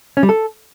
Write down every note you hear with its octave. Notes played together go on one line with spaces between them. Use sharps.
C#4
G3
A4